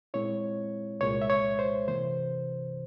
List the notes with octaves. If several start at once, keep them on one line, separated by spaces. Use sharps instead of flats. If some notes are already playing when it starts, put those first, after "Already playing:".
A#2 G#3 C4 E4 C#5
C2 A#2 G#3 C#5
E5
C#5
C5
C3 E3 A#3 C5